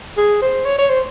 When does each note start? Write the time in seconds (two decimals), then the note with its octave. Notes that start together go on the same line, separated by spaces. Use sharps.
0.17 G#4
0.42 C5
0.65 C#5
0.79 C#5
0.89 C5